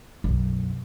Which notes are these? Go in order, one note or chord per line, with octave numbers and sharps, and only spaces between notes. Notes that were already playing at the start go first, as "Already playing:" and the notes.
B1 F#2